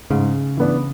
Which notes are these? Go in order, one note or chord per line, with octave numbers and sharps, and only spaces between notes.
G#2 C#3
E3 B3 D4